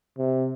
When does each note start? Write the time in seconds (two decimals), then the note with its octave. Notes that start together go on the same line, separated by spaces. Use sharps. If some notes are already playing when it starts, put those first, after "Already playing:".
0.18 C3